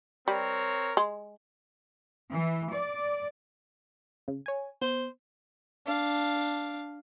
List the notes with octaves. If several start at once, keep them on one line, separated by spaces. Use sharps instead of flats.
G3 C4 A#4 C#5
G#3
E3
D5
C#3
C#5 G#5
B3 C5
D4 F5